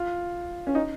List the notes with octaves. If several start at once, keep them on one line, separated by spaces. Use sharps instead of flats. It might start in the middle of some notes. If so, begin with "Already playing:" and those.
Already playing: F4
C#4
D#4